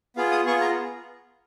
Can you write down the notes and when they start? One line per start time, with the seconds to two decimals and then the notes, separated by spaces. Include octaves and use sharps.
0.16 B3 F4 G#4 F5
0.32 D#6
0.46 B3 F4 G#4 C#6
0.61 A#5